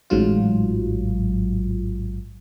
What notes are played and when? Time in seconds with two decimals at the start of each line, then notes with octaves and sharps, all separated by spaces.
0.10 A1 G#2 F#3 F4